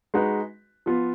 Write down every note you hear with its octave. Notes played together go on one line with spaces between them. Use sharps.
G#3 D#4 F#4 B4
F3 B3 F4